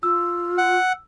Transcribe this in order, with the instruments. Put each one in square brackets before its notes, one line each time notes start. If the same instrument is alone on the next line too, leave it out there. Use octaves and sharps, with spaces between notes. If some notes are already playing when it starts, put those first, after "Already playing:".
[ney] F4 [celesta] E6
[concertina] F#5